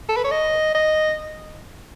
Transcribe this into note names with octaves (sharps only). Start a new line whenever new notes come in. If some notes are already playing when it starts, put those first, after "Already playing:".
A4
B4
C#5
D#5
D#5